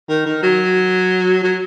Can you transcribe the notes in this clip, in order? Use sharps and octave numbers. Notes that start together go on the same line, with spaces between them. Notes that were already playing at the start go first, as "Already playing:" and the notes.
D#3
D#3
F#3
F#3